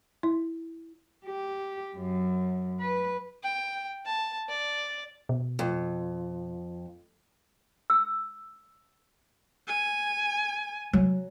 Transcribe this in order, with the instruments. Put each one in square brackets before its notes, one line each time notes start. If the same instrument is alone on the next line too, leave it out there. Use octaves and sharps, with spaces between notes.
[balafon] E4
[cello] G4
F#2
B4
[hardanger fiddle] G5
A5
D5
[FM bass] B2
[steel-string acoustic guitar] F2
[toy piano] E6
[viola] G#5
[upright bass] F#3